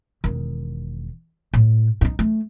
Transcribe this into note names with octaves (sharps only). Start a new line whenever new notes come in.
E1 D#3
A2
G2 D#4
A3